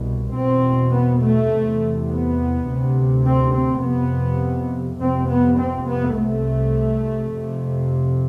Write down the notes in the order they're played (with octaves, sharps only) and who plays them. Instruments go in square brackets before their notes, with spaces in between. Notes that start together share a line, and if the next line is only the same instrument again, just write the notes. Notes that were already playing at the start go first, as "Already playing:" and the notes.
Already playing: [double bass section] C2 B2
E2 B2 C4
B3
A3
E2 C3
B3
D2 C3
C4
C4
F2 C3 B3
F2 C3 C4
B3
C4
B3
C2 C3 A3
F2 C3